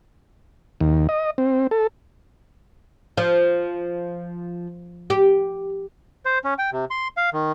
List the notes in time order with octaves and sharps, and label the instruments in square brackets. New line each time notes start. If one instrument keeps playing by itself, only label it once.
[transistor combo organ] D#2
D#5
C4
A4
[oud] F3
G4
[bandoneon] C5
C#4
G5
C3
C6
F5
D#3